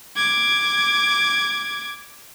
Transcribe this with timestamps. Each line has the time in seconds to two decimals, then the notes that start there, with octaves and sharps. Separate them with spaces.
0.16 D6 G#6